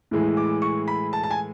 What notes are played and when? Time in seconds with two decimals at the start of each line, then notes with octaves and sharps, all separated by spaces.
0.11 A2 E3 G#3
0.37 D6
0.62 C#6
0.88 B5
1.13 A5
1.23 A5
1.31 G#5